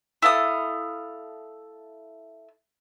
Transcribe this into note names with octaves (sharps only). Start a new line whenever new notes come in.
E4 A4 F5 D#6